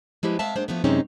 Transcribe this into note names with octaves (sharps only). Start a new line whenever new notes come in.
F3 G#3 E4 G4 B4
G#3 C4 E5 F5 A5
G3 G#3 A#3 D4 C5
E3 F3 A3 B3 E5
F#2 C3 G#3 C4 C#4 D#4